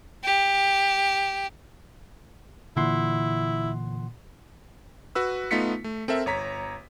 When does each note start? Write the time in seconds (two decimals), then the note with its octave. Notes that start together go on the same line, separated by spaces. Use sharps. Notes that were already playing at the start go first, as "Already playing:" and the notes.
0.24 G4
2.77 A#2 D3 E3 E4 F#5 C6
5.15 F#4 B4 E6
5.51 A3 B3 D#4 F4 B6 C#7
5.84 A3
6.08 C4 A4 A#4 E5
6.26 G1 C#5 A#5 B6